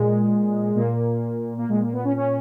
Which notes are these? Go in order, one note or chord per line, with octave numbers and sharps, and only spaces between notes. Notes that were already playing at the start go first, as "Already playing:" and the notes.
Already playing: A#2 G#3
A#2 A#3
A#3
A#2 G#3
A#3
B3
C#4
C#4